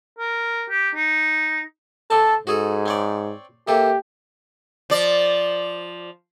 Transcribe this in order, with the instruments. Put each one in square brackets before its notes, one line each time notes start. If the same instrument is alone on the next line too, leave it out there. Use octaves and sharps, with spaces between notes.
[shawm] A#4
G4
D#4
[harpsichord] D3 C4 A5 [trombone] A4
[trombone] G#2 [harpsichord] F#4 G#4 A4
[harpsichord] C4 C#5 D5
[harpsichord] C3 A#3 A4 [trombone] G4
[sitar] F3 D5